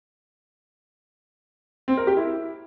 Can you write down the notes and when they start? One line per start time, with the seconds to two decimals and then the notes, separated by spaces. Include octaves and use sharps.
1.88 C4
1.97 A#4
2.07 G4
2.17 E4